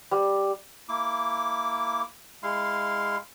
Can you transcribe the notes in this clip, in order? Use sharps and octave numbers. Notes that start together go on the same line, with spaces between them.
G3
A#3 E4 D6
G#3 E4 F5 C6